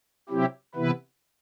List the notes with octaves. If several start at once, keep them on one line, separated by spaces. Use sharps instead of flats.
C3 F#3 C4 E4 G4
C3 E3 B3 E4 B4